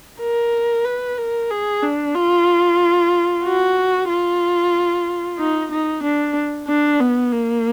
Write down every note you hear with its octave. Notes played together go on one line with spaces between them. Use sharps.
A#4
B4
A#4
G#4
D4
F4
F#4
F4
D#4
D#4
D4
D4
B3
A#3